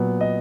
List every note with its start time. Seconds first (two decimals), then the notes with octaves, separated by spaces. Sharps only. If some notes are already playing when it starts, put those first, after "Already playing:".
Already playing: A#2 F#3 B3
0.21 D#5